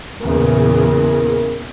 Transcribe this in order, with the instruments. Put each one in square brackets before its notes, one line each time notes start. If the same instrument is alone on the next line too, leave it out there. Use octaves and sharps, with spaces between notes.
[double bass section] E2 A#2 C#3 [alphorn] A#4